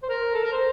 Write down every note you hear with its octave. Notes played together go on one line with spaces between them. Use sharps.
C5
A#4
A4
A#4
C5